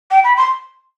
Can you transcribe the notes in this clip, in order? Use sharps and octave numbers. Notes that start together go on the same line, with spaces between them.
G5
B5
C6